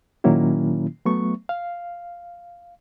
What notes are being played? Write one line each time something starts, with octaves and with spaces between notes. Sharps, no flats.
A#2 D#3 F#3 A#3 C#4 E4
F#3 A3 B3 C#6
F5